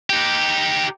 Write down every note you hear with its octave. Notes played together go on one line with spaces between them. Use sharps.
D#4 G4